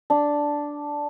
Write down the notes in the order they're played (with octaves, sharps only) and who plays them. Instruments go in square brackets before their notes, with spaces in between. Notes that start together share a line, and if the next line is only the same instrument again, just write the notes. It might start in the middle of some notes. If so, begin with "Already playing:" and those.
[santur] D4